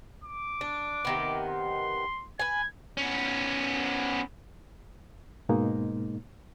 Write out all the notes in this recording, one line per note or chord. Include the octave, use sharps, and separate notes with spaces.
D6
D4
C3 D#3 B3
C6
B4 G#5 G#6
B3 C#4
G#2 B2 G#3 A#3 D#4